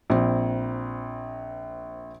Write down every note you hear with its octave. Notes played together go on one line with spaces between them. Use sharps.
A#1 C4